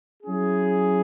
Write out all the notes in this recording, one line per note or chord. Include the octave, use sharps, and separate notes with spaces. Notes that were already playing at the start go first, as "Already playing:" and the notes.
F#3 C#4 E4 G#4